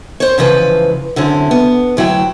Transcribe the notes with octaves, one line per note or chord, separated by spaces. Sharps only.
C5 C#5
G#2 C#3 E3 F3 A#4 B4
F#2 D3 C4 C#4 E4
B3
D2 F#3 E4 G5